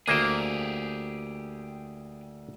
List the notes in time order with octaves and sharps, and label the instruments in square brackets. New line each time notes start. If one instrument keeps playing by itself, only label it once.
[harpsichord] D2 D#6 [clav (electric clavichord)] A#3 C5 G5 [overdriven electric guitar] G4 G#4